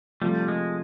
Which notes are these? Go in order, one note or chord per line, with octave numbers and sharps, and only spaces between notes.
C3 F3 G3 A3
G#3